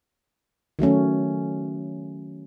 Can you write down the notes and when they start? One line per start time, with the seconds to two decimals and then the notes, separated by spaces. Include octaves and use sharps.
0.79 D#3 F#3 A3 C#4